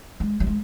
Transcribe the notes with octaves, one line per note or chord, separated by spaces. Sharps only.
G#3
G3
G#3